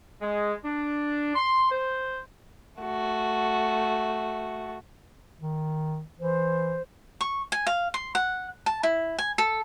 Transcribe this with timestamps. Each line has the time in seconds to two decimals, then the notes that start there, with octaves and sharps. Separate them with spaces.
0.21 G#3
0.65 D4
1.35 C6
1.71 C5
2.81 A3 F#4
5.41 D#3
6.19 E3 C5
7.21 C#6
7.52 G#5
7.67 F5
7.94 C6
8.15 F#5
8.66 A5
8.83 E4
9.19 G#5
9.38 A4